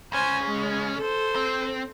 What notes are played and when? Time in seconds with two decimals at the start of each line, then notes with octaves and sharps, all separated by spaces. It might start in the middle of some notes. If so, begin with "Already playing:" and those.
0.12 C#2 C#4 C5 G#5
0.43 G#3
0.98 A4 C5
1.36 C4